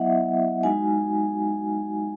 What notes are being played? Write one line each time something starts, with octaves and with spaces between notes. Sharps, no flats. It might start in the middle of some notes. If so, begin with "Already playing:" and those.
Already playing: F#3 B3 E4 D#5 E5 F#5
G#3 D#4 F#4 G#5